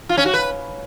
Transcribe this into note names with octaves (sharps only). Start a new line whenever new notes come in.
F4
C#4
F#4
B4